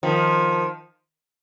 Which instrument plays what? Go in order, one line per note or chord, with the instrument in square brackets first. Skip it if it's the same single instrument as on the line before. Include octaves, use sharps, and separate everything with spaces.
[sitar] D#3 F3